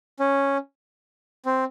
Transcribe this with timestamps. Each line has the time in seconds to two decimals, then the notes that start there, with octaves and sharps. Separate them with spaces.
0.20 C#4
1.46 C4